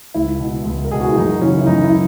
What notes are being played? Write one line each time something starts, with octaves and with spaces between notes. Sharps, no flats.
C#2 E4
B2
C#2
A#4
B2 G#4
F#4
E4
F#2 D#4
C#3 E3 C#4
E4
F#2 D#4
E4
E3